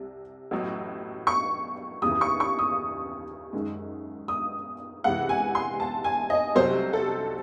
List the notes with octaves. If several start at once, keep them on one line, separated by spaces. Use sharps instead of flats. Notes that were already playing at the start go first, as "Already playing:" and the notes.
Already playing: C2 C3
A1 A2 F#3
C#6
D#2 C#3 E3 D#6
C#6
C#6
D#6
F#1 F#2 D#3 G#3
D#6
C#2 C3 E3 F#5
G#5
C6
A5
G#5
D#5
C2 C3 F#3 A3 C5
A4